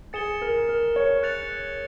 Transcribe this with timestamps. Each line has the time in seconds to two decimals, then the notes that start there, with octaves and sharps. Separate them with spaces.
0.13 G#4 A6 C#7 E7 G7
0.42 A#4
0.69 A#4
0.96 C#5
1.23 F#6 A6 C#7 F7